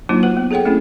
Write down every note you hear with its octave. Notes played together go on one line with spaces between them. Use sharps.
F#3 A#3 D4 D#4 F4 F#4
F#4 B4 F#5
B3
G#4 A4 C#5 F#5 G5
A3 C4 C#4 E4 G#4